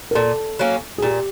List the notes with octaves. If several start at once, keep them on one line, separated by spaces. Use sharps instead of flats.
A#4
A#2 A4
F#3 A#3 C#4
G#4
A#2 G4